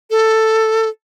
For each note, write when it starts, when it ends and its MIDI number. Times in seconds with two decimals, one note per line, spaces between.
0.10 0.89 69